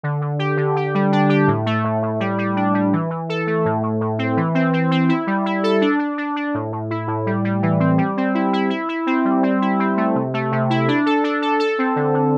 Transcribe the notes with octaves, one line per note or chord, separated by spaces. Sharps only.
D3
D3
G4
D3
G4
G3
D4
G4
A2
A3
A2
A2
G3
G3
D4
G3
E3
E3
A4
A3
A2
A2
A2
C4
E3
C4
C4
C4
E4
G3
E4
A4
D4
D4
D4
D4
A2
A2
E4
A2
G3
G3
E3
C4
G3
C4
E4
E4
E4
E4
C4
G3
C4
E4
C4
A3
C3
A3
C3
E4
D4
A4
D4
A4
A4
C4
D3
D3